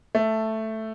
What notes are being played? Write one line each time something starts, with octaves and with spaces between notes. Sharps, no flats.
A3